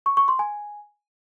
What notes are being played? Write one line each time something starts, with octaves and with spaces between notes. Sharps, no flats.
C#6
C#6
C6
G#5